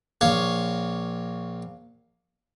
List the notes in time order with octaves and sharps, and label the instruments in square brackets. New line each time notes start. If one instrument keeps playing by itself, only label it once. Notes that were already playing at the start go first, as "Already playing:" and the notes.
[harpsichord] A#1 C#5 F5